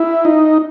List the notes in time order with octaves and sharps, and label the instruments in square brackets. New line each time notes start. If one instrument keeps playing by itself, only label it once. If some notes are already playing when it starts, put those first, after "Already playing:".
Already playing: [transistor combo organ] E4
D#4